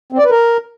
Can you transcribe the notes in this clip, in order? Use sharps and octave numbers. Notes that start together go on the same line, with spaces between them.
C4
D5
B4
A#4